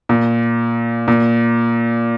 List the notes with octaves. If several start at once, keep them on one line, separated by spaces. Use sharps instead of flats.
A#2
A#2